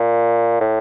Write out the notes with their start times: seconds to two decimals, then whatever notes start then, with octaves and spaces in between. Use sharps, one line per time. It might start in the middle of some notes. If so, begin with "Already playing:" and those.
Already playing: A#2
0.60 A2